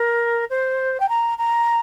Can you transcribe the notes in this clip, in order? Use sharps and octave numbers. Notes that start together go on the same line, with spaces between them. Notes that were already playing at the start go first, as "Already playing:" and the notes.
Already playing: A#4
C5
G5
A#5
A#5